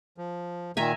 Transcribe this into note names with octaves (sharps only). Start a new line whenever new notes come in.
F3
A#2 D#3 E5 G#5 A#5